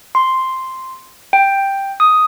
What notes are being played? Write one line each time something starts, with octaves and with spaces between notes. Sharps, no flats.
C6
G5
D#6